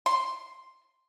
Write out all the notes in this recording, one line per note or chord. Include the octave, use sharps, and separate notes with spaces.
C6